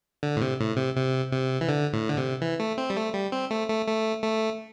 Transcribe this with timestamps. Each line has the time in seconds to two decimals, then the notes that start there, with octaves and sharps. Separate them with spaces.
0.23 D3
0.36 A2
0.41 C3
0.59 A2
0.77 C3
0.96 C3
1.32 C3
1.61 E3
1.69 D3
1.93 A2
2.08 D3
2.17 C3
2.41 E3
2.60 A3
2.78 C4
2.90 G3
2.96 A3
3.14 G3
3.32 C4
3.51 A3
3.69 A3
3.87 A3
4.23 A3